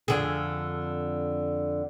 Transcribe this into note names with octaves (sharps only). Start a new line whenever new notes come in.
F2 D3 G#4